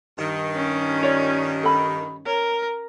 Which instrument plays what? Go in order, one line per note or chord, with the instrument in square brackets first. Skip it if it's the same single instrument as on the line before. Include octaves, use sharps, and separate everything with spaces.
[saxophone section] G2 D#3
[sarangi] C#4
[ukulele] F4 C#5 D5
A4 B5
[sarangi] A#4 [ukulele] C#5